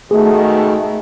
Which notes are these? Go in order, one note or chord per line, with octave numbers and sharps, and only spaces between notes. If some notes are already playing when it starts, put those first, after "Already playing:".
G#2 B2 D#3 A3 G#4